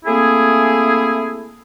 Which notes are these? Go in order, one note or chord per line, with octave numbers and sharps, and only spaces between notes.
A3 A#3 C4 E4 G#4